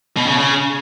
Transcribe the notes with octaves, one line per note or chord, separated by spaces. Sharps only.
B2
C#3
C#3